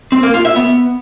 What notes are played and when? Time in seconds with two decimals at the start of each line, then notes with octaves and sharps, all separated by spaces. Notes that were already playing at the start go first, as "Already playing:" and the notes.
0.12 C4
0.23 A#3
0.34 F4
0.45 E5
0.56 B3